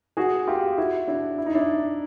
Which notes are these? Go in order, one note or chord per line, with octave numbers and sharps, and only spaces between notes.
F#4 G#4
F4 G4
E4 F#4
D4 E4
E4
D#4
D4 E4